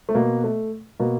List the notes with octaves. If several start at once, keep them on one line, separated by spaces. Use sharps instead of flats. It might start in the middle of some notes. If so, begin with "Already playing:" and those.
A3
B2 A#3
A3
B2 A#3